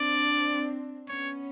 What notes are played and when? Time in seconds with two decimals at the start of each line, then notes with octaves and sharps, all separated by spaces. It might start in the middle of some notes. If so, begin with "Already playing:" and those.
Already playing: C4 D4 D5
1.08 B3 C#4 C#5